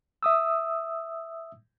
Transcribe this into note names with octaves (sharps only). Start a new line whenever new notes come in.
E5 D#6 E6